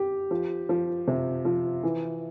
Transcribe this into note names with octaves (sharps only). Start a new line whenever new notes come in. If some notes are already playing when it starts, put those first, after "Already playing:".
Already playing: G4
F3
F3
C3
F3
E3